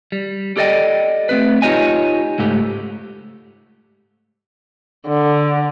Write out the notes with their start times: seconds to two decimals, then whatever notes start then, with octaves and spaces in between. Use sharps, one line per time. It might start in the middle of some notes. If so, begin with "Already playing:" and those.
0.12 G3
0.57 G4 A4 D5 D#5 G5
1.29 A3 C4 B4
1.62 D#4 F4 G4 C#5 D#5 G#5
2.38 C#2 G#2 A3 G4
5.08 D3